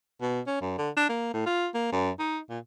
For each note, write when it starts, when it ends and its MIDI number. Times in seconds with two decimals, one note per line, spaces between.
0.22 0.41 47
0.47 0.60 61
0.61 0.76 42
0.78 0.90 50
0.97 1.08 62
1.09 1.31 58
1.33 1.44 45
1.46 1.68 65
1.74 1.89 58
1.92 2.11 42
2.19 2.39 63
2.50 2.59 46